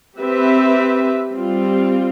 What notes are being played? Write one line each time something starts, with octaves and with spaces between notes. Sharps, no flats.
C4 G4 B4 E5
G3 C4 F4